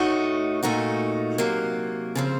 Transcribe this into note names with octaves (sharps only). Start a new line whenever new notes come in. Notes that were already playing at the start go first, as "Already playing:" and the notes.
Already playing: A2 A3 D#4 F#4
A#2 A3 D#4 F#4
C3 F#3 A#3
C#3 F3 C4